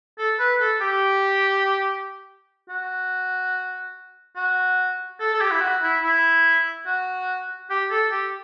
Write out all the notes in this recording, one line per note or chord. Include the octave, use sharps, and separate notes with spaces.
A4
B4
A4
G4
F#4
F#4
A4
A4
G4
E4
F#4
E4
E4
F#4
G4
A4
G4